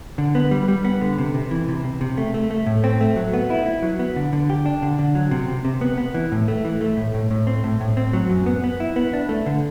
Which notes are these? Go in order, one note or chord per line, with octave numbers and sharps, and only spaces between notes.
D3
B3
G3
G3
B3
D3
C3
C3
E3
C3
C3
C3
A3
A3
A3
A2
C4
A3
F#3
B3
E4
E4
F#3
B3
D3
D3
G4
D4
D3
D3
F#3
C3
C3
C3
B3
B3
E3
A2
A3
E3
A3
A2
A2
A2
C4
A2
A2
C4
F#3
F#2
B3
B3
E4
B3
D4
A3
D3